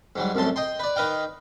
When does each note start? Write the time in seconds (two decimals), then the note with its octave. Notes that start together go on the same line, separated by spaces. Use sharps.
0.16 G#2 F#3 G3
0.35 C2 F#2 A2 A5 C6
0.56 D#5 G5 C6
0.79 B4 D5
0.96 D#3 B4 D#5 F5 G5